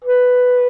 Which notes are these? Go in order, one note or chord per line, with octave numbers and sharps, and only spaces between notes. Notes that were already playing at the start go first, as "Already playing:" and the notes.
B4